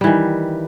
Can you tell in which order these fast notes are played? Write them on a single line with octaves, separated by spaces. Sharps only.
G3 E3 D#3